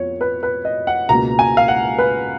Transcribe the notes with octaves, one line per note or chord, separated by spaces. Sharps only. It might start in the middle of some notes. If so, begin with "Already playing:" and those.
Already playing: F2 F3 B3 C#5
B4
B4
D#5
F#5
C#2 B2 A#3 A#5
G#5
F5
F#5
B4